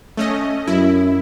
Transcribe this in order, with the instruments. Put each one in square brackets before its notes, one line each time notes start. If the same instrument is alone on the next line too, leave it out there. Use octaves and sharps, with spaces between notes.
[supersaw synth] A3 C#4 D#5
[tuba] F#2 [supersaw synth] E4